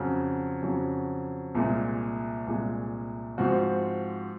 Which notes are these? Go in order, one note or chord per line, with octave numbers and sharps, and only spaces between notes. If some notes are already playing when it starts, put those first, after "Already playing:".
Already playing: F2 C#3 F#3
F2 C#3 F#3
C2 A#2 G#3
C2 A#2 G#3
G#2 F3 C4 F#4